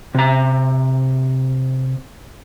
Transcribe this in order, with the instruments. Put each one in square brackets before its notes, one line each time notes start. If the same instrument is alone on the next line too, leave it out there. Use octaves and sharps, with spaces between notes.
[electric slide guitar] C3 A#5